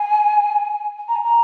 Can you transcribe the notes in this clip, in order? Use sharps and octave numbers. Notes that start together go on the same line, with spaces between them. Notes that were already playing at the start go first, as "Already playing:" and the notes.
Already playing: G#5
A#5
G#5
A#5